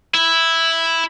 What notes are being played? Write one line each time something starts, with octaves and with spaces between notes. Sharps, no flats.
E4